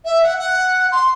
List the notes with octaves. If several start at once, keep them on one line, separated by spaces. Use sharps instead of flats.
E5
F#5
F#5
C6